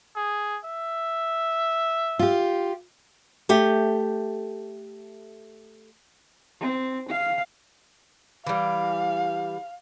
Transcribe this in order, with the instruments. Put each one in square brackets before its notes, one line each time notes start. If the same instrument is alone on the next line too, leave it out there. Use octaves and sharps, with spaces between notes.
[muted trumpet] G#4
E5
[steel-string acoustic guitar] F4 G4
[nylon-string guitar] A3 G4
[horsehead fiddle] C4
F5
[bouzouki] E3 G3 [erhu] F5